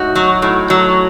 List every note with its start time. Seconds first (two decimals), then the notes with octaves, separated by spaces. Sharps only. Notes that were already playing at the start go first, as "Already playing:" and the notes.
Already playing: A2 D#4 F#4
0.15 F#3
0.42 A2
0.70 F#3